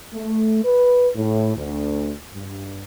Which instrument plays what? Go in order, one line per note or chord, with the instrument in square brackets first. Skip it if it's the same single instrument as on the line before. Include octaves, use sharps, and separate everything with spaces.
[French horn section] A3
B4
A2
D2
G2